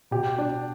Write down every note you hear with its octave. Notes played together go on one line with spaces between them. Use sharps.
B2 G4
D4